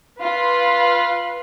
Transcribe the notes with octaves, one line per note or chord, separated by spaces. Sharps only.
F4 B4